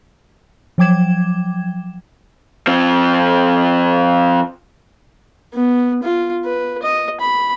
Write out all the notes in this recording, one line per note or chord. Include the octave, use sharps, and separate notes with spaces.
F3 F#3 G5 D6 G#6 E7
F3 C4
B3
F4
B4
D#5
B5